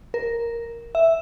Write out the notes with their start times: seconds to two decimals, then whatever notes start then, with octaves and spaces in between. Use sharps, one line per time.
0.14 A#4
0.95 E5